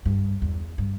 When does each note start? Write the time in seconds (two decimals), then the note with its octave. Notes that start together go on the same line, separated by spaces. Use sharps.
0.06 G2
0.42 E2
0.78 G2